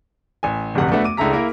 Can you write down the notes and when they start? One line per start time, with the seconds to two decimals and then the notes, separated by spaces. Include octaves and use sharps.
0.43 A1 G#5
0.74 D1 G1 F2 C3 F#5
0.92 A3 B3 D4 F#4 E5 F#5
1.04 D6 D#7
1.17 C#2 D4 E4 A4 A#5 B6
1.33 A#3 E4 A#4